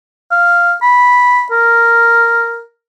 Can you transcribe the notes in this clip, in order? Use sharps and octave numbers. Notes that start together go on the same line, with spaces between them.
F5
B5
A#4